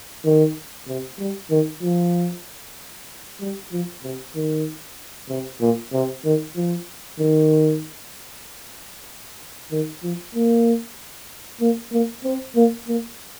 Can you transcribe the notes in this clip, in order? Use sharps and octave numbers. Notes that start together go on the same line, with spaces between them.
D#3
C3
G3
D#3
F3
G3
F3
C3
D#3
C3
A#2
C3
D#3
F3
D#3
D#3
F3
A#3
A#3
A#3
C4
A#3
A#3